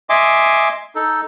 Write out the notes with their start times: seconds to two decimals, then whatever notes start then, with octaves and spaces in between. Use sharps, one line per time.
0.10 D#5 E5 G#5 C6 D6
0.96 D#4 A4